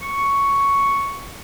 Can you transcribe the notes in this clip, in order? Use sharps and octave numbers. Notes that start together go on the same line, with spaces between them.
C#6